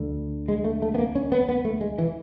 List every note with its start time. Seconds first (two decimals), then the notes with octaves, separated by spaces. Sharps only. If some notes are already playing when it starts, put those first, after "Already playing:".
Already playing: D2 D3
0.48 G#3
0.64 A3
0.82 A3
0.95 B3
0.98 A#3
1.15 C#4
1.32 B3
1.49 B3
1.65 A3
1.81 G#3
1.98 E3